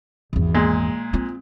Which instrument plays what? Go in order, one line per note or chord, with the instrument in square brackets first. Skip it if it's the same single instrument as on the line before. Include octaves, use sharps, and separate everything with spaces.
[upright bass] G#1 E2
[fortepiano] A#2 G#3
[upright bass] C4 F4